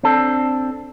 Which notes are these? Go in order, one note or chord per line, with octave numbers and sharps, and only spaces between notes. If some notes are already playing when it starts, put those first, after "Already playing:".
C4 D4 A4